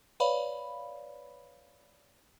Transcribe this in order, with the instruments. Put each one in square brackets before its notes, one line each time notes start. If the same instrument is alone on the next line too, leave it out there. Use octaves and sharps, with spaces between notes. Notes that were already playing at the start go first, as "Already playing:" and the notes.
[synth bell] B4 C#5 D5 F5 B5